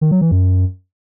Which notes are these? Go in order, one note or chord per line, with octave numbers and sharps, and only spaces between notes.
D#3
F#3
E3
F#2